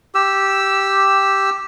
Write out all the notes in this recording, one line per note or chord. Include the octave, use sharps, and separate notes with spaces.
G4 E6